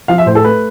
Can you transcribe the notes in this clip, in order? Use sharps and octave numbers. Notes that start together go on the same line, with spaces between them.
F3 F5
E5
A2 C5
A4
A3 B4